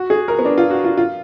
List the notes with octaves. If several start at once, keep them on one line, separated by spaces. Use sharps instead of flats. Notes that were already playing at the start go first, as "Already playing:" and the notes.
Already playing: F#4
G#4
A#4
B3
D4
F4
F#4
F4
F4